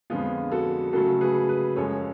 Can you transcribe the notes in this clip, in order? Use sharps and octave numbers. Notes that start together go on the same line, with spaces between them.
F2 D3 F3 G#3 B3 F4 G#4
F#4 A4
C#3 F#3 A3 F#4 A4
G#4 B4
G#4 B4
F#2 F3 G#3 A4 C#5